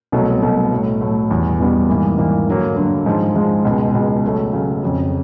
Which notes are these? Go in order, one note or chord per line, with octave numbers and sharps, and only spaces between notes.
C2 B2 F#3 A3
C2 B2 F#3 A3
A2 F#3 A3
A2 F#3 A3
E2 B2 G3 B3
E2 B2 G3 B3
G#2 E3 G3 A#3
G#2 E3 G3 A#3
G2 D3 F#3 A#3
G2 D3 F#3 A#3
G#2 F3 G#3
G#2 F3 G#3
C#2 B2 G#3
C#2 B2 G#3
C#3 F#3 A3
C#3 F#3 A3
F2 C#3 F#3